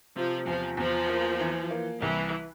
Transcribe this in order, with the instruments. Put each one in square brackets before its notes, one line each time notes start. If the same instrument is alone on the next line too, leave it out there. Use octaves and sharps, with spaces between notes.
[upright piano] C3 [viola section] F3
[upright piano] E2 [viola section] F3
[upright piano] E2 [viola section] F3
[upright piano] A#3
E3
A#3
[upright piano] C2 [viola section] E3